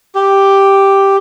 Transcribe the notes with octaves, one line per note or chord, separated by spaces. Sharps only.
G4